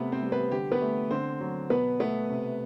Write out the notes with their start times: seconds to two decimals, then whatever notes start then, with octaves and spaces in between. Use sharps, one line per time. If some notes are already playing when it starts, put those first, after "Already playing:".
Already playing: C3 A3 B3 B4
0.12 C4 C5
0.22 G3
0.32 B3 B4
0.51 D3 G4
0.72 B3 B4
0.82 A3
1.11 D3 C4 C5
1.40 F#3
1.70 B2 B3 B4
2.00 A3 B3 B4
2.29 C3